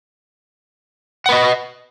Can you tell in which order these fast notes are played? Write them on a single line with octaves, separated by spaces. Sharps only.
F#5 B4 D#5